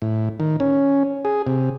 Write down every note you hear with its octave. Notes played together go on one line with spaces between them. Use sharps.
A2
D#3
C#4
G#4
C3